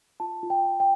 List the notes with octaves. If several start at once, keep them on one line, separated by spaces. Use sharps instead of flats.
F4 A5
F4
G5
F4
G5